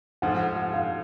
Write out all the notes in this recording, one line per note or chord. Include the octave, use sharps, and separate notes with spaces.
G#2 F3 A3 F#5
F#5
F5